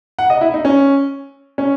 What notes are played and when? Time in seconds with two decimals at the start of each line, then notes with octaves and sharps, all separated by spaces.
0.19 F#5
0.30 D#5
0.41 E4
0.54 D#4
0.65 C#4
1.58 C#4